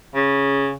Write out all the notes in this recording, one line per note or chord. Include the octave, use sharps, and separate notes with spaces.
C#3